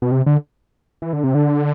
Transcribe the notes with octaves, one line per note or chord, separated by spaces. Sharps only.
B2
C3
D3
E3
D3
C3
D3